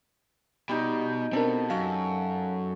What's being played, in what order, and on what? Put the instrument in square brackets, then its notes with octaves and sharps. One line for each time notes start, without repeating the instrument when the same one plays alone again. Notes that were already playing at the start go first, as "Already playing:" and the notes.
[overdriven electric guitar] B2 [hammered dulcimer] G3 D#4
[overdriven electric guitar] B2 [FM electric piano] C4 D4 A#4 [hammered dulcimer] A4
[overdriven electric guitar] F#2 [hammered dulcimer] F#4 [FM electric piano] F5